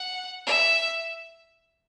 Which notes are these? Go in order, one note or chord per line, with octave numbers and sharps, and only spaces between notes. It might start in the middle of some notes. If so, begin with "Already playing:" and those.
Already playing: F#5
E5